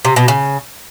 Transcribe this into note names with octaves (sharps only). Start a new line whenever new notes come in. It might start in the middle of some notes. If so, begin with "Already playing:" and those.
C3
B2
C#3